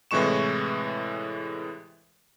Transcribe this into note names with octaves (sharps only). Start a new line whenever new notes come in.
A2 C3 E3 G#3 C#6 E7